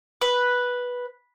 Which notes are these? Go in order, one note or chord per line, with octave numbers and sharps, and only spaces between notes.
B4